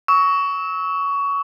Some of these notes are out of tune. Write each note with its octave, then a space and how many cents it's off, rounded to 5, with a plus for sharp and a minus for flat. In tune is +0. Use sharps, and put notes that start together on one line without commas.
C#6 +20 E6 -35